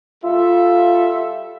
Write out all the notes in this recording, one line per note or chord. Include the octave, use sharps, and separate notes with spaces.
G3 F4 A4 E5